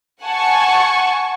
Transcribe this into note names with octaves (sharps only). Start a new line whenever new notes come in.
F#5 G#5 A5 C#6